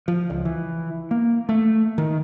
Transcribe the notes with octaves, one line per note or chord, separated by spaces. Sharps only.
F3
C#2
E3
A#3
A3
D#3